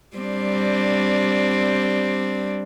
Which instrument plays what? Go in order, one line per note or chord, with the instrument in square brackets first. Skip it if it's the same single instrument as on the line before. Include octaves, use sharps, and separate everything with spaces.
[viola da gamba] G3 C4 D4